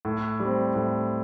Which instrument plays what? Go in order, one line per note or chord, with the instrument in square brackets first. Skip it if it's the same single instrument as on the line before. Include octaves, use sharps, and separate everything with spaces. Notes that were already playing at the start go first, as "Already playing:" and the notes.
[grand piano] A2
G3
C4
A2